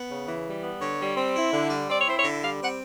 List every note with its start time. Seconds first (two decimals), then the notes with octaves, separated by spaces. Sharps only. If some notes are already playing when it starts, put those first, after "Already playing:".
Already playing: B3
0.09 C#3
0.27 E3
0.45 G3
0.62 B3
0.80 D3 C#5
0.99 G3
1.17 C4
1.34 E4
1.52 D3
1.70 G3
1.88 C4 D5
1.98 C#5
2.06 E4 C5
2.17 C#5
2.24 D3
2.42 G3 F5
2.60 C4 F#5